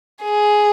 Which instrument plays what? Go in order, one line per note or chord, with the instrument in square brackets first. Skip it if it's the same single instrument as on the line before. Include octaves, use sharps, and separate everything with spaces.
[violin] G#4